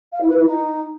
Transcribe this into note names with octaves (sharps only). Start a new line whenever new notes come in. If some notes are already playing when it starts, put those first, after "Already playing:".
F5
E4
B4
E4
D#4